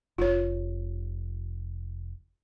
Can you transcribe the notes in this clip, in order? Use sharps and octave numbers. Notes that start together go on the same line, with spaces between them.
F1 F4 C#5